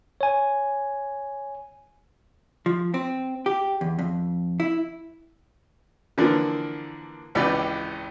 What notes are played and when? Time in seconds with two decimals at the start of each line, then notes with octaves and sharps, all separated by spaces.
0.21 C#5 G#5
2.66 F3
2.94 C4
3.46 G4
3.81 E2
3.99 F2
4.60 E4
6.18 D3 E3 F3 A#3 D4
7.35 G#1 C#2 E3 G4 B4 D5